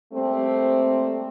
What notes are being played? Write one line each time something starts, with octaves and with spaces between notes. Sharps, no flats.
G3 A3 A#3 C4